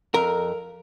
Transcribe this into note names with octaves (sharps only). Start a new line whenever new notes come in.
F2 A#4